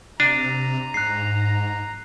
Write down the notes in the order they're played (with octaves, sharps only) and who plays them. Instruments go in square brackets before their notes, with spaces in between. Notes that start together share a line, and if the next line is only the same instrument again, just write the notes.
[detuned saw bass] C3 [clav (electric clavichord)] D4 [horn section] A#5 [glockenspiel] D#7
[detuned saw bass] G#2 [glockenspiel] F#6 C7